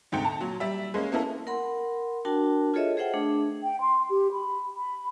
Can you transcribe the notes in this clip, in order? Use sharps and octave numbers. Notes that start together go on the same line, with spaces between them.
D2 G#2 C3 G5 C#7
A5 A#5
A#2 F#3
G3 E5
G#3 A#3 C#4
A#3 B3 C#4 E4 A4 A#4
A#4 F#5 B5 C6
D4 F#4 A#4 G5 A5
F4 G#4 A4 C#5 D#5 E5
G#4 C5 E5 F#5 G5
A3 D4 G#4
G5
C6
G4
B5
B5